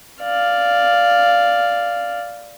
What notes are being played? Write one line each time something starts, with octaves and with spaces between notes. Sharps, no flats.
D5 F5